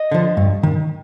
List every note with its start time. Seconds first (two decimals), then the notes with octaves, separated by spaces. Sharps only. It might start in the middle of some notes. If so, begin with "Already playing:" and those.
Already playing: D#5
0.11 D3 F3
0.37 G2
0.63 D#3